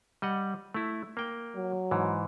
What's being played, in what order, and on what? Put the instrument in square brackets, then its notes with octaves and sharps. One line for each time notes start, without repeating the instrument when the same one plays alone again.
[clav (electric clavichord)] G3 D#5 F#5
A3 E4
A#3 G5
[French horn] F#3
[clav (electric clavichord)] G#2 E3